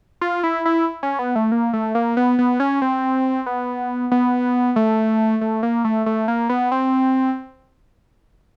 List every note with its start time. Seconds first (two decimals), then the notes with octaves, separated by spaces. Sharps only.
0.21 F4
0.43 E4
0.65 E4
1.03 C#4
1.19 B3
1.36 A3
1.52 A#3
1.73 A3
1.95 A#3
2.17 B3
2.39 B3
2.60 C#4
2.82 C4
3.46 B3
4.11 B3
4.76 A3
5.41 A3
5.63 A#3
5.85 A3
6.06 A3
6.28 A#3
6.49 B3
6.72 C4